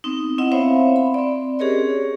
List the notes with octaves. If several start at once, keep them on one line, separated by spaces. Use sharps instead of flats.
B3 C4 D#4
B3 C4 E4 D#5 F#5
C4 C5 C#5 E5 F5 B5
B5
C4 D5
C#4 G4 G#4 A#4 C#5 D#5